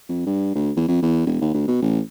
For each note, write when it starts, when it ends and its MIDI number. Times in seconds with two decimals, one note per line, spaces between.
0.09 0.23 41
0.26 0.52 43
0.55 0.71 38
0.76 0.86 40
0.88 1.00 41
1.03 1.26 40
1.26 1.39 28
1.41 1.50 39
1.54 1.66 38
1.68 1.80 47
1.82 2.00 33